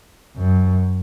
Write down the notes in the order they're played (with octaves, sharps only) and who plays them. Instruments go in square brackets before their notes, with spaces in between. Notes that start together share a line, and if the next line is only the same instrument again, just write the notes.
[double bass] F#2